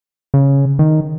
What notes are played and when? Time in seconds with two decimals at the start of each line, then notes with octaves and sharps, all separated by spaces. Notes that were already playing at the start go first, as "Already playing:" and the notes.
0.34 C#3
0.79 D#3